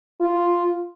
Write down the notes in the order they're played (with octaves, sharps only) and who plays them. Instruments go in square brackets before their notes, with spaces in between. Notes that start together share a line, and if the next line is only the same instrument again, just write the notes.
[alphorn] F4